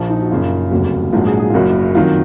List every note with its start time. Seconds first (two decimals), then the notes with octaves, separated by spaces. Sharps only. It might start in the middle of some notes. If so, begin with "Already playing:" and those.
Already playing: A#1 A#2 F3
0.10 D#4
0.21 F#4
0.31 F#1 F#2 C#3 F4
0.71 F1 D#2 C#3 F#3
1.12 A#1 G#2 F#3 F4
1.26 G#4
1.39 G#4
1.50 F4
1.54 F#1 F#2 C#3 F#3 F#4
1.95 F2 D#3 F#3 F4